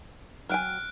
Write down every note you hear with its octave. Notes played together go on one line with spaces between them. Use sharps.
F#3 G5 G#5 F6 F#6 D7